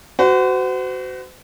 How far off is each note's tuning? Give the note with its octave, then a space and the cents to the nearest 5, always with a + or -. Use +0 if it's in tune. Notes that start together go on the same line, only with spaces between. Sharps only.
F#4 +15 C5 -40